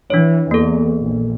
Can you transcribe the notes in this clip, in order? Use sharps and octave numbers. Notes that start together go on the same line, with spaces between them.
E3 D4 C#5
E2 A#3 A4
A#1